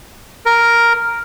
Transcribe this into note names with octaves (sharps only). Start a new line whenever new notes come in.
A#4